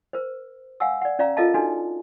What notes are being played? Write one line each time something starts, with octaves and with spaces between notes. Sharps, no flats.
A#4 C5
F5 F#5 G#5 E6
D5 F#5
C#4 D5 F5 A#5
F4 A4 A#4 D#5 F5 A5
D4 D#4 F#4 A4 B4 G#5